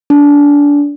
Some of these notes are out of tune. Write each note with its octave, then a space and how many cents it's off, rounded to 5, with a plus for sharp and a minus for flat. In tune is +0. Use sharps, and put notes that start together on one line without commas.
D4 -25